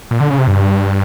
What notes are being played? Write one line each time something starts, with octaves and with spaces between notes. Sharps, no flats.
A#2
D3
C#3
C3
G2